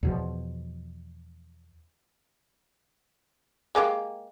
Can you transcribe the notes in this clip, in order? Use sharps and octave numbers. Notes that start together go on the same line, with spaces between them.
E2 B2 F3
G#3 A#3 G4